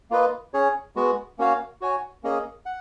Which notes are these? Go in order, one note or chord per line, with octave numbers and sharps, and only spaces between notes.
A#3 F4 B4 D#5
C#4 G#4 C#5
G#3 B3 F#4
A#3 C#4 F#4 C#5 F5
F#4 C#5 G#5
A#3 C#4 G#4 D#5
F#5